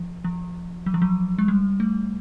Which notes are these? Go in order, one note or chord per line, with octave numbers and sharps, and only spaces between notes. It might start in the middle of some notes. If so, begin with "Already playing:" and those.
Already playing: F3
F3
F#3
F3
F#3
G#3
G3
A3